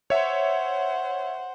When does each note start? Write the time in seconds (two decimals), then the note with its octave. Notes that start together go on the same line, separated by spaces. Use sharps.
0.10 C5 C#5 E5 F#5